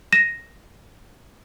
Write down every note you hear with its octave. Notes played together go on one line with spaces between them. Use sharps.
A#6 D#7 E7